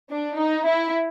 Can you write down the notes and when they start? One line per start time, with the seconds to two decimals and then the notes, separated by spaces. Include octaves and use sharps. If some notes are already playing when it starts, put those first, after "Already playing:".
0.10 D4
0.39 D#4
0.67 E4